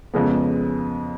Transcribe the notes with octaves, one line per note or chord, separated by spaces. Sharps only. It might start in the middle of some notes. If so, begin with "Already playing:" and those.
F2 C#3 G#3 B3